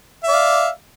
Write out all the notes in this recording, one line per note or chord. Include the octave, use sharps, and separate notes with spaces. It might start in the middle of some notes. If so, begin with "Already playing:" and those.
D5 E5 F5